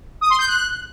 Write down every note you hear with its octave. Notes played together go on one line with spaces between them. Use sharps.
D#6
C6
G6
F#6